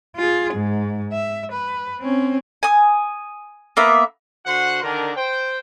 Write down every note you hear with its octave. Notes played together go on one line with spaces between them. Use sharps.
F4 G#4
G#2
E5
B4
C4 C#4
G#5 D#6
A#3 B3 E5
D3 F#4 C5 F#5 C6
D3 D#3 D4 A#4
C5 G5